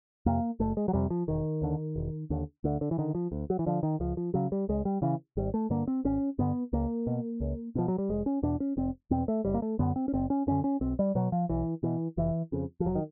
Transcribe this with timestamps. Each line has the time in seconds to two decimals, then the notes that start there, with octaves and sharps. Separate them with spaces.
0.26 F2 C3 A#3
0.60 F#1 A3
0.77 G#3
0.88 F#3
0.93 F2 C3 G3
1.10 F3
1.28 E1 D#3
1.62 D#2 D3
1.96 E1
2.30 D#2 D3
2.64 D2 D3
2.81 D3
2.91 E3
2.98 D3 D#3
3.15 F3
3.32 D2
3.50 F#3
3.59 E3
3.66 D3 F3
3.83 D#3
4.00 C#2 F3
4.17 F3
4.34 C#3 F#3
4.52 G3
4.69 C#2 G#3
4.85 G3
5.02 C#3 E3
5.37 G#1 G3
5.54 A3
5.70 G2 D3 A#3
5.88 C4
6.05 G#1 C#4
6.39 G2 D3 B3
6.73 C#2 A#3
7.07 B2
7.40 C#2
7.75 B2 F3
7.88 F#3
7.98 G3
8.09 F1 G#3
8.26 C#4
8.43 E2 B2 D4
8.60 C#4
8.77 F1 C4
9.11 E2 B2 C4
9.28 A3
9.45 F#1 G3
9.54 A#3
9.62 A3
9.79 F#2 D3 B3
9.96 C4
10.08 C#4
10.13 F#1 C4
10.30 C#4
10.47 F#2 D3 C#4
10.64 C#4
10.81 B1 C4
10.99 G3
11.15 B2 F#3
11.32 F3
11.49 B1 E3
11.83 B2 E3
12.17 F1 E3
12.52 F2 C#3
12.80 F3
12.85 F1 F#3
12.95 D#3